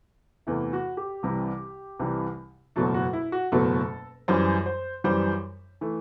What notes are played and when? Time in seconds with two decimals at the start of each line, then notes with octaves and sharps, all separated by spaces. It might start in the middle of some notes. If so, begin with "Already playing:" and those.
0.47 E2 C3 E3 A3 E4
0.73 F#4
0.97 G4
1.23 C2 C3 E3 G3
1.99 C2 C3 E3 G3
2.76 F#1 E2 B2 F#3 A3 A4
2.94 F#4
3.13 E4
3.32 F#4
3.52 F#1 E2 B2 F#3 A3 A4
4.28 F#2 E3 G3 C5
4.66 C5
5.04 F#2 E3 G3 C5
5.81 E3 A3